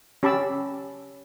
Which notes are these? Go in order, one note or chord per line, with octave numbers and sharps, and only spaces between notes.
C#4 G4 A5 B5 D6 E6